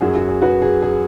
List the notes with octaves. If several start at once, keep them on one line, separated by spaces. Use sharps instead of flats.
F#2 F#3 G#4
F#4
G#4
F#4 B4
G#4
G#4